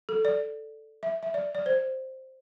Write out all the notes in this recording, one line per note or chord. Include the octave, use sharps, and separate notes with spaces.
A4
D5
E5
E5
D5
D5
C5